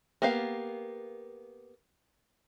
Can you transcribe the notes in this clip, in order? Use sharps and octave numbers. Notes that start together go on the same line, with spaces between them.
A#3 B3 G4 F5